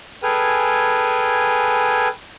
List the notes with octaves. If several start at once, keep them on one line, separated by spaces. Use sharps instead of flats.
G#4 A4 B4 G5 G#5 F6